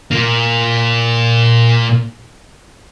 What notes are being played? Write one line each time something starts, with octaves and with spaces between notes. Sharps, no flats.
A#2 A#3